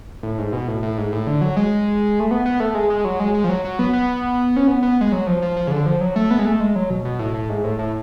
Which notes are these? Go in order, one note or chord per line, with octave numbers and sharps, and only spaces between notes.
A2
G#2
B2
A2
A2
G#2
A2
D3
F#3
G#3
A3
B3
B3
A3
G#3
G#3
F#3
G#3
G#3
F3
F#3
F#3
B3
B3
C#4
B3
B3
G#3
F#3
F3
F3
F3
C#3
D3
F3
F#3
A3
B3
G#3
A3
G#3
F#3
B2
B2
A2
A2
G#2
A2
A2